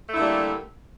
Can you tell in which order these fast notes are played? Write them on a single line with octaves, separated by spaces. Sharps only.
A3 E4 D3 A#3 G3